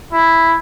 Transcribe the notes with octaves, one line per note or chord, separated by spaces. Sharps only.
E4